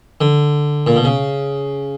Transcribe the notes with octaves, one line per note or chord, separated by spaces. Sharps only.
D3
A#2
B2
C#3